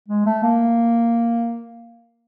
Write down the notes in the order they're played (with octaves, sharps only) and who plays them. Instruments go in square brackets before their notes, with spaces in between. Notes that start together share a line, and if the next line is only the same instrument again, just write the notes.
[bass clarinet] G#3
A3
A#3